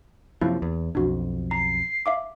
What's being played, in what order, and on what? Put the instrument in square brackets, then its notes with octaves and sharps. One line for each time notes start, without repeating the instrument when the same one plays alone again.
[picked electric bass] F#2 C3 F3 [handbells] A#3 E4
[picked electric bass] E2
[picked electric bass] B1 F2 [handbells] D4 F#4
[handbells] A#5 [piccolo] C7
[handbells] E5 F5 D6